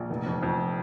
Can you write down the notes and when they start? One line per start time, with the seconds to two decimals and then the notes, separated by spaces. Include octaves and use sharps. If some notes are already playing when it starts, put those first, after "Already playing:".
Already playing: A#1
0.10 F1
0.26 F2
0.43 F2